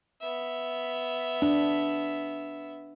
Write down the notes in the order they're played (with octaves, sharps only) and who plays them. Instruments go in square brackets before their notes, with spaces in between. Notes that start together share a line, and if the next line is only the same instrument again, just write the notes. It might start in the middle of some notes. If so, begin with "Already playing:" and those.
[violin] B3 E5
[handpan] D4